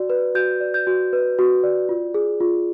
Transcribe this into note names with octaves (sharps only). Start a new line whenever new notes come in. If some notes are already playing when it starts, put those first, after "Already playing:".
Already playing: F#4 D5
B4
F#4 G6
D5
G6
F#4
B4
F#4
D5
F4
G#4
F4